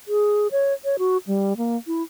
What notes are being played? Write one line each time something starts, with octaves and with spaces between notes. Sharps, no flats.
G#4
C#5
C#5
F#4
G3
A#3
E4